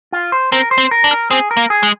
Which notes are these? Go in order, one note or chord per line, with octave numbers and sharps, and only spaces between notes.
F4
C5
C4 A#4
C5
C4
A#4
D4
A#4
C4 G#4
A#4
A#3
G#4
G#3